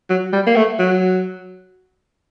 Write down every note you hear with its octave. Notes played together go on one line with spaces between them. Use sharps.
F#3
G3
A#3
A3
F#3